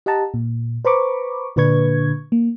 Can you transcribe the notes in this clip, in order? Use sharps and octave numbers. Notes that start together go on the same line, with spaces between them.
G4 D#5 F#5 A5 A#5
A#2
B4 C5 A#5 B5 C#6 D6
A#2 D3 D4 B4 C#6 G#6
A#3